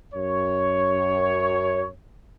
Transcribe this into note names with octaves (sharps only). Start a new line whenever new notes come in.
F#2 C#5